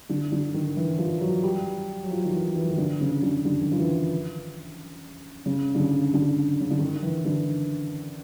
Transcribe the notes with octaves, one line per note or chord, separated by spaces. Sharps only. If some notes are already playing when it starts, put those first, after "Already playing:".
D3
D3
D#3
E3
F3
F#3
G3
F#3
F3
D#3
E3
E3
D#3
D3
C#3
D3
D3
D#3
F3
E3
C#3
D3
C#3
D3
C#3
D3
D#3
E3
D3